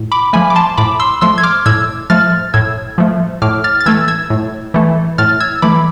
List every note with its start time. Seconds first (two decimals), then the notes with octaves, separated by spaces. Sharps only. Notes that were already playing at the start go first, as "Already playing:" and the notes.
Already playing: A2
0.12 B5 D6
0.33 F3 A3 G#5 B5
0.50 D6
0.56 A5 C6
0.78 A2 B5 D6
1.00 C6 E6
1.21 F3 A3 C6 E6
1.38 G#6
1.43 D6 F6
1.66 A2 E6 G#6
2.10 F3 A3 F6 A6
2.54 A2 E6 G#6
2.98 F3 A3
3.42 A2 D6 F6
3.64 F6 A6
3.81 A6
3.86 E3 A3 E6 G#6
4.08 E6 G#6
4.30 A2
4.74 E3 A3
5.18 A2 F6 A6
5.40 E6 G#6
5.62 E3 A3 B5 D6